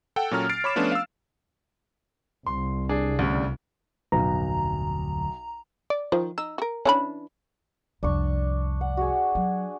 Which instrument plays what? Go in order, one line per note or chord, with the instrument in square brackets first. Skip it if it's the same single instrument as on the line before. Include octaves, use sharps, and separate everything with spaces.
[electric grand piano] A4 F#5 G5
A#2 F#3 C#4 A4 A#5 F6
F6 A6 C7 D7
C#5 B5 D6 E7
F3 A3 B3 C#4 D4 F4
F5 E6
[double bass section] C2 [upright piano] C6
[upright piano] D4 G#4
D2 C#3 G3
[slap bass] D1 F2 [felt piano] B1 [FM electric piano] A#5
[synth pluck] D5
[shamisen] D#3 [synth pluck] F3
[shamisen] D#4 [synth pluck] E6
[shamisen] F#4 A#4
[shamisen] E3 D4 B5 [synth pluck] C#4
[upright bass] C2 F2 [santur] D4 C#6
[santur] F#5
F#4 G#4
[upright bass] F#3